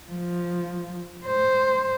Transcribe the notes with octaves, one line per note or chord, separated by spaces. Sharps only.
F3
C5